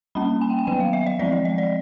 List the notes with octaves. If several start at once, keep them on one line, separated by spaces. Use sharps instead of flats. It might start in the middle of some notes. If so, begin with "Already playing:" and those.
G3 A#3 C#4 B5
G#5
G5
G#5
D#3 F#3 B3 G5
F5
E5
D#5
F3 G#3 C4 D5
D#5
D#5
D5